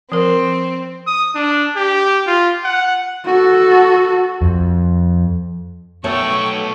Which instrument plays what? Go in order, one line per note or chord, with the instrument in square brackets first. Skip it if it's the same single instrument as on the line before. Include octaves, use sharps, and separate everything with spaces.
[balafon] F3 A#4 [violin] C4
[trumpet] D#6
D4
G4
F4
F#5
[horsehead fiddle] F#4 A4
[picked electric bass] F2
[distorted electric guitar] B1 B3 [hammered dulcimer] A3 A4 [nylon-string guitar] C#5 [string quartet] G5 C#6